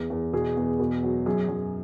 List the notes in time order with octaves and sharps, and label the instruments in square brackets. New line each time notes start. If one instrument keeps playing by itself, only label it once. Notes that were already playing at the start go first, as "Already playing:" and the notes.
Already playing: [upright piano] E2
E2
B2 G#4
E2
B2
F#3
F#2 G#4
F#2